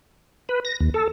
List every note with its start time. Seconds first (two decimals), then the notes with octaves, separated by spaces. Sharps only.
0.49 B4
0.65 A#6
0.80 D#2
0.94 A4